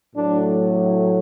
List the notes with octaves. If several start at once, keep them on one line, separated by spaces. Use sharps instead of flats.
A2 F#3 A3 D4